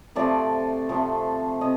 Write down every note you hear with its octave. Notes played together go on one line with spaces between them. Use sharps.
C3 F3 A3 D5
C3 F3 A3
C3 D#5